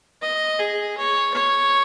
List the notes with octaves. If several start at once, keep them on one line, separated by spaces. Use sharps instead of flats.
D#5
G#4
C#5
C#5